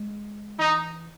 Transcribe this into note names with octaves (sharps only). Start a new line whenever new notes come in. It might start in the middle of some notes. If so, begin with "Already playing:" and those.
Already playing: G#3
E3 D#4